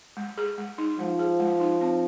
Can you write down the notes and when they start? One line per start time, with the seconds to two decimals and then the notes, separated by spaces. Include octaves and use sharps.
0.17 G#3
0.38 G#4
0.58 G#3
0.78 D#4
0.99 F3 G#3
1.19 G#4
1.40 G#3
1.60 D#4
1.81 C4